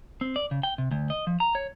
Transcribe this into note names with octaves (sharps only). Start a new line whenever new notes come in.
C4
D5
C#3
G5
C3
D2
D#5
F3
A#5
C#5